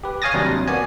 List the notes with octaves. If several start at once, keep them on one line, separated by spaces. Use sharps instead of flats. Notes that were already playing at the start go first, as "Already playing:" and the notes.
G4 B4
C#5 F5 G#5 D#6 A6 A#6
D#2 C3 F#3 G3 D4
A#3 B3 F#4 D5 G#5